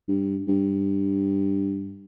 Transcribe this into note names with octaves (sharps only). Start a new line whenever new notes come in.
G2
G2